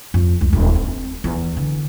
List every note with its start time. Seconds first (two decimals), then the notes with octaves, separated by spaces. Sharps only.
0.14 F2
0.41 C#2
0.53 D#1
0.75 C4
1.24 E2
1.57 D3